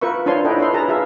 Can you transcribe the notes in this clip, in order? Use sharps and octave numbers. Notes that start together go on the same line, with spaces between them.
F4 A#4 B4 E5 C#6
D4 F4 C5 C#5 A5 C6
D4 E4 A4 B4 D#5 G5
B4 C#5 E5 C6
G#4 A#4 B4 A5 A#5
F4 G#4 E5 F5